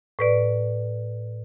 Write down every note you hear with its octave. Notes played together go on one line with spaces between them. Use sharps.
A2 B4 D5